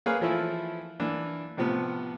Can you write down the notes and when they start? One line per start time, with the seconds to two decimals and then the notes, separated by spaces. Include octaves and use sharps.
0.06 A#3 G#4 A#4 B4 C#5 F5
0.21 E3 F3 A3 E4
1.00 E3 A#3 D4
1.57 A2 C3 F3 B3